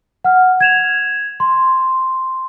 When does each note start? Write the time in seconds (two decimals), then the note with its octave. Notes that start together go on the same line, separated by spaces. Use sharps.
0.24 F#5 F6
0.61 G#6 E7 F7
1.40 C6